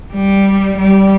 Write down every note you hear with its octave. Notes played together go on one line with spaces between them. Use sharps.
G3
G3